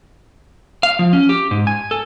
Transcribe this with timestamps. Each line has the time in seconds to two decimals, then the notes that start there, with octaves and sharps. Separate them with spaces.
0.83 F5
0.99 F3
1.13 C#4
1.29 G4
1.51 G#2
1.67 G#5
1.91 A4